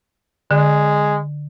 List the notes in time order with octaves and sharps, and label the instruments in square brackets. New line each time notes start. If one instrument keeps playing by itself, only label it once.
[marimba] D3 [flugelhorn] G#3